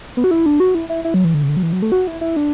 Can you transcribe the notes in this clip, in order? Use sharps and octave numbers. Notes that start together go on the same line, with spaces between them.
B3
F#4
E4
D4
F#4
E4
E4
E4
F#3
E3
D3
C#3
D3
F#3
E3
F#3
A3
F#4
E4
E4
D4